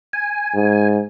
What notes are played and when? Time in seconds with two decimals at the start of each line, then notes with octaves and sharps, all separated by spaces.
0.13 G#5
0.54 G#2